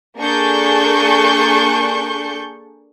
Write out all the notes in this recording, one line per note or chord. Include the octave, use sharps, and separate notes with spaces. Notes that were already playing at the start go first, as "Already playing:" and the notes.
A#3 D4 G#4 A4 C#6 G6